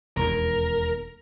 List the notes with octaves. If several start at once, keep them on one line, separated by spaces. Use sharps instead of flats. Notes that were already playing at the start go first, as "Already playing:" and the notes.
E1 D#2 A#4